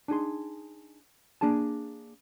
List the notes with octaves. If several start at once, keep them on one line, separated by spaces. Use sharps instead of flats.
D4 D#4 G#4 C6
A#3 D4 G#4 G#5 A5